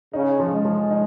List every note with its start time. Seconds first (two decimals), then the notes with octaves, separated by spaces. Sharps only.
0.13 C#3 D#4
0.40 F3
0.53 G#3
0.65 F3
0.91 D#4